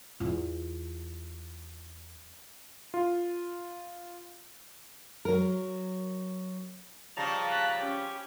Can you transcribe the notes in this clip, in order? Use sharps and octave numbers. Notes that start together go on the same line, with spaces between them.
E2 F4
F4
F#3 A#4
C#3 F3 G3 A5 A#5
F#6 B6
C#4 G4